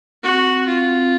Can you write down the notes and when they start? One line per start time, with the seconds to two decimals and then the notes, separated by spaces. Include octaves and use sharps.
0.23 C4 F#4
0.45 C4
0.67 C4 F4
0.89 C4